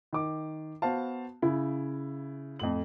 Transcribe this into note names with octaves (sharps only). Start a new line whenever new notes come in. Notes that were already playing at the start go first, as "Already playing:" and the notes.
D#3 D6
B3 F#4 C5 F5 A5
C#3 E4
F2 A2 F#7